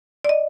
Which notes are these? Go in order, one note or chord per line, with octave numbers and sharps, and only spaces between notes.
D5
D#5